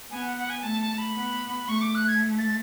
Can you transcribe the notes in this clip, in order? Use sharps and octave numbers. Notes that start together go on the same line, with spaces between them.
B3 G#5
F#5
F#5
G#5
A3 A5
A5
B5
B3
A3 C#6
D6
F#6
G#6
A6